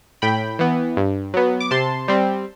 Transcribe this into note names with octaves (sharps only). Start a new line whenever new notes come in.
A2 G5 B5
E3 B3
G2
F#3 B3
D6
C3 A5 C6
G3 C4